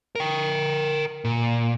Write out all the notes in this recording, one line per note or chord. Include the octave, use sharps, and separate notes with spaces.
A#4 G5
A#2